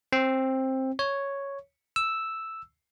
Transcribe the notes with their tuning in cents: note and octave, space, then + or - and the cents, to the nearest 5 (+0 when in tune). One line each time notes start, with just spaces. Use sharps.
C4 +15
C#5 +0
E6 +0